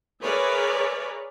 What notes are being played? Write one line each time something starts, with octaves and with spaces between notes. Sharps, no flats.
G#4 A#4 B4 C#5 D5 E5